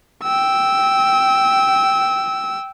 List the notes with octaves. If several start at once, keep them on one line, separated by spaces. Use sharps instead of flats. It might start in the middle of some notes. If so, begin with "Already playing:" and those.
G5 E6